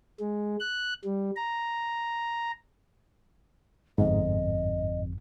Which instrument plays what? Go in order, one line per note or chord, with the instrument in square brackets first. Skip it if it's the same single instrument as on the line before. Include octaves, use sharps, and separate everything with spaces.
[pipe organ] G#3
F#6
G3
A#5
[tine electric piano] G1 F2 [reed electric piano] G#2 [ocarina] D#5